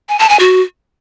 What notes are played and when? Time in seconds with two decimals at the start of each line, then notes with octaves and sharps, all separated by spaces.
0.09 G#5
0.19 A5
0.29 G#5
0.39 F#4